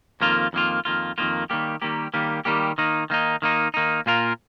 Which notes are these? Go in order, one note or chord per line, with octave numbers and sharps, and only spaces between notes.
F2 D#3 A#3 F4
F2 D#3 A#3 F4
F2 D#3 A#3 F4
F2 D#3 A#3 F4
D#3 G3 A#3 G4
D#3 G3 A#3 G4
D#3 G3 A#3 G4
D#3 G3 A#3 G4
D#3 A#3 D#4
D#3 A#3 D#4
D#3 A#3 D#4
D#3 A#3 D#4
A#2 A#3 F4 A#4